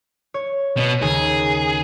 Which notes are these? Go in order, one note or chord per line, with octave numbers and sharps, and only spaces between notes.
C#5
B2 B3
D#2 C#3 G#4